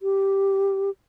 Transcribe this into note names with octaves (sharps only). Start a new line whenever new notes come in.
G4